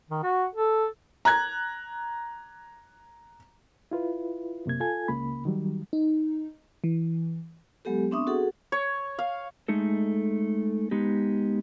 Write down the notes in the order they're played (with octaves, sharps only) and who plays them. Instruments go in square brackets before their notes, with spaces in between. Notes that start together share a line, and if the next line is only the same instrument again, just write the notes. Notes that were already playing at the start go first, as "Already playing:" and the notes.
[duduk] D#3
F#4
A4
[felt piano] A#5 F#6 G#6
[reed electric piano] E4 F4 B4
F#2 C3 A#3 G#6
F4 A4 G#5 G#6
C#2 C#3 A#3 B5
D#3 F#3 G3
[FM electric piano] D#4
E3
[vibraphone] F#3 G#3 B3 G4 A4
B3 C4 D4 E5 C#6 D#6
F#4 G#4 A4 F#5
[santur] C#5
F5
[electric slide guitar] G#3 A3 D#4 A4
G#3 B3 D#4 G4